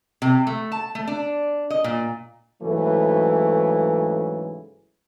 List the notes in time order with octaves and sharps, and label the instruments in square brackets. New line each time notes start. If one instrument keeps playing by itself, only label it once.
[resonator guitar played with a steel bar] C3
A3
A5
A3
D4
D#5
A#2
[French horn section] G#2 C#3 E3 F#3 A3